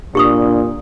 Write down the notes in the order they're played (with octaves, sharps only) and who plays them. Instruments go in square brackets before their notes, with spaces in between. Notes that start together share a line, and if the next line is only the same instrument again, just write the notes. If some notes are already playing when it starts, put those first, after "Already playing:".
[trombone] A#2 [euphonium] D4 [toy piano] G4 C#6 D#6